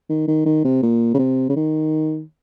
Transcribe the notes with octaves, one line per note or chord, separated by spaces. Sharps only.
D#3
D#3
D#3
C3
A#2
C#3
C3
C#3
D#3